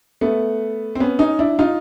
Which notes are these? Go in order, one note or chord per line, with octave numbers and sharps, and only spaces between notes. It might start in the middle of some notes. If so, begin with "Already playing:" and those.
A3 B3
C4
B3 C#4
C#4 D#4
D4 E4
D#4 F4